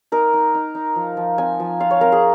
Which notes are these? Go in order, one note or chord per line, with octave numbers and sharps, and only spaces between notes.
D#4 A#4
D#4
D#4
D#4
F3
F3
C4 G#5
F3
F4 F5
C#5
C4 A#4
G#4